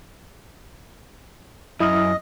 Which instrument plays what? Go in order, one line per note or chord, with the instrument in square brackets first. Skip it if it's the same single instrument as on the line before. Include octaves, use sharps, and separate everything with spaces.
[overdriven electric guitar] F#2 [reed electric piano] E4 D#6 F6 [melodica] D#5